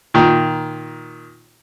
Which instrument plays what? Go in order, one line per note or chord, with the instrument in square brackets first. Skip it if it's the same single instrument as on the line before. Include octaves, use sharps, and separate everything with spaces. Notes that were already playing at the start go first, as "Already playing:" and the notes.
[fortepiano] A#2 D#3